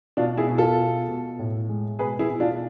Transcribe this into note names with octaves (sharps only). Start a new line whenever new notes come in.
B2 D4 F4
E4 G#4
B2
F4 A4
B2
B2
A2
G#3
B2 G#4 B4
E4 G#4
B2
D4 F4